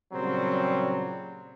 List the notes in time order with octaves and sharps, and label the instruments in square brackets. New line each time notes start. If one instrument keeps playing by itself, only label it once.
[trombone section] A#2 C#3 F#3 G3 C4